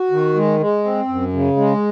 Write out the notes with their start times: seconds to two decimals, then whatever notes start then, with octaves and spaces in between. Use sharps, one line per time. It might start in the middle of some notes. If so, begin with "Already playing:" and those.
Already playing: F#4
0.11 D#3
0.36 G#3
0.60 G#3
0.84 C4
1.08 F#2
1.33 C#3
1.57 G#3